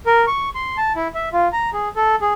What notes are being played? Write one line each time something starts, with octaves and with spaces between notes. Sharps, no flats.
A#4
C#6
C6
A5
E4
E5
F4
A#5
G#4
A4
G#4